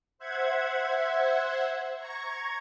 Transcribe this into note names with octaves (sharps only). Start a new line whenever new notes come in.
C5 E5 F#5 G#6
A#5 C#6 G#6